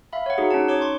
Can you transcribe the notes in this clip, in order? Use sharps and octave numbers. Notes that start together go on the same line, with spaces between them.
E5 F5 B5
C#5 F#5
D#4 F#4 G#4
C#4 D#4 A5
C#5 C#6 D6
C6 C#6